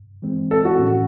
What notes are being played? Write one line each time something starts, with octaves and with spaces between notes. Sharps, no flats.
E3 G#3 C4
A4
F#4
A2 E3 A3 C#4 G#4